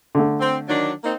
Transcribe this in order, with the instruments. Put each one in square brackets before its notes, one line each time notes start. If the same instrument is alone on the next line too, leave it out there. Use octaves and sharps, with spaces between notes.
[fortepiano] D3 A3
[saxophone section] C4
D#3 F#3 D4
A#3 C4 D#4